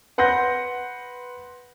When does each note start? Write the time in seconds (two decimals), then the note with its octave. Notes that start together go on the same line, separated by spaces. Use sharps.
0.18 B4 F#5 C6 G6 A#6